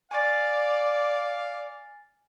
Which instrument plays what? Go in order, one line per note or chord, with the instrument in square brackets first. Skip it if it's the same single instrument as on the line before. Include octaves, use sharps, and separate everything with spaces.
[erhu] D5 [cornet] F5 [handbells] G#5 A6